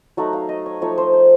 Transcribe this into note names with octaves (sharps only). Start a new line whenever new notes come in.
F#3 A3 D#4 F#5
F5
D#5
C#5
F3 A3 D#4 C#5
C5
C5